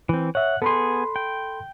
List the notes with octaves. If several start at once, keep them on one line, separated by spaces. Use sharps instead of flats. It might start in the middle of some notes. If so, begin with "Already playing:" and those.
E3 C4
C#5 E5 F#5
B3 G#4 A4 B5 C6
G5